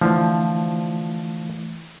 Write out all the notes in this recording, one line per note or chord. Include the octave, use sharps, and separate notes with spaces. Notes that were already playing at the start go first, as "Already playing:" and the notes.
D3 E3 F3 A3 E4